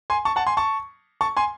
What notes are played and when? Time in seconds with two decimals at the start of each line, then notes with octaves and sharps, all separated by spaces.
0.10 G#5 C6
0.25 A5 C#6
0.36 F#5 A5
0.47 G#5 C6
0.57 A5 C#6
1.21 A5 C#6
1.37 G#5 C6